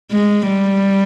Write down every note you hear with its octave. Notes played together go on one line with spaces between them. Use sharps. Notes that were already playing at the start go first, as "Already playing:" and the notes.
G#3
G3